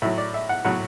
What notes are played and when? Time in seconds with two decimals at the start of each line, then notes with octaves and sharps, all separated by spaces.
0.02 A2 F#3 E5
0.18 D5
0.34 E5
0.49 F#5
0.65 A2 F#3 F#5